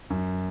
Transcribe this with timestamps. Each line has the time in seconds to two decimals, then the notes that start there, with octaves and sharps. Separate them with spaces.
0.10 F#2